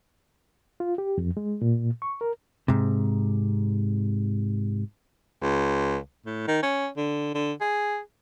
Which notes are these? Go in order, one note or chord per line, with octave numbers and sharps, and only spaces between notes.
F4
G4
F2
G#3
A#2
C#6
A#4
G#2 C3
C#2
A2
D#3
C#4
D3
D3
G#4